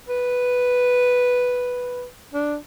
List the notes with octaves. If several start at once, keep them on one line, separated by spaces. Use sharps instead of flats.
B4
D4